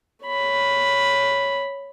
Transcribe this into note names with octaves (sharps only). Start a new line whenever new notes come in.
C#5 B5